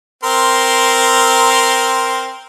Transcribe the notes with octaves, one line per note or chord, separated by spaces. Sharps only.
C4 A#4 C6